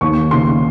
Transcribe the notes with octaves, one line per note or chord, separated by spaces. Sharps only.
D#2 C#6
C#3 C6